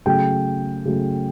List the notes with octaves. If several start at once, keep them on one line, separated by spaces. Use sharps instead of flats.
C#3 F#3 A3 G5
C#3 F#3 A3